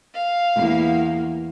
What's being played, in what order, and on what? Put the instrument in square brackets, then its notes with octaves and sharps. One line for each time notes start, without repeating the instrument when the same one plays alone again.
[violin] F5
[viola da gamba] E2 A#3